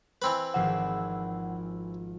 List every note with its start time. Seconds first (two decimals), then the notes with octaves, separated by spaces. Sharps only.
0.22 E3 C4 B4
0.54 G#1 F3 F#5 E6